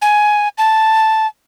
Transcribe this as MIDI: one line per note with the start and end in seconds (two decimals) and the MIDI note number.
0.02 0.48 80
0.58 1.27 81